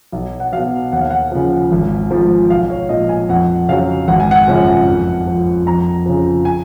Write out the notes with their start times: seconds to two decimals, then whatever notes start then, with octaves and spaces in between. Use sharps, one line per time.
0.12 B1
0.40 F#5
0.52 B2 F#3 F5
0.93 D#2 F#5
1.01 F5
1.11 F#5
1.32 C#3 F3
1.72 G#1
2.11 G#2 F3
2.50 B1 F5
2.70 C#5
2.89 A#2 F3 D#5
3.09 G#5
3.29 F2 F#5
3.68 C#3 F#3 F5
4.08 G#1 F#5
4.20 G#5
4.31 F#5
4.48 F#2 C#3 F3
4.88 F2
5.27 F3
5.67 F2 A#5
6.06 C#3 F3
6.45 G#5